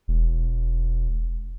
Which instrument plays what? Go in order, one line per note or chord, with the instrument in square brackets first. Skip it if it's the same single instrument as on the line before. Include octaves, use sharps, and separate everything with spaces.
[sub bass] E1